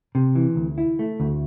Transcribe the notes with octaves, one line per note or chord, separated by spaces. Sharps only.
C3
E3
D2
E4
A3
D2